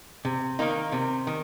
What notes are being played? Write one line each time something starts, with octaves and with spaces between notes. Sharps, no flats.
C3
D#3 A#3 D#4
C3
D#3